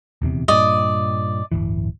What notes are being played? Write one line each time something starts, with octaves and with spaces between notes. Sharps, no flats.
D#1 E2 C3
G2 A#2 D5 D#5
D1 G1 E3